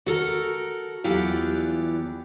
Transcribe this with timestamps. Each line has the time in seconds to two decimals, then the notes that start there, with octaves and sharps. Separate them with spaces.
0.06 F#4 A4 A#4
1.04 E2 E3 F#3 F4 G4 D5